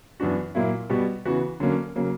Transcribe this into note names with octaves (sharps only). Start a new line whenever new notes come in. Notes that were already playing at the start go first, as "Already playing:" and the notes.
F#2 E3 B3 D4 F#4
A#2 F#3 A#3 E4
B2 G3 B3 F#4
C#3 E3 B3 F#4
D3 F#3 A#3 C#4
C#3 F#3 A#3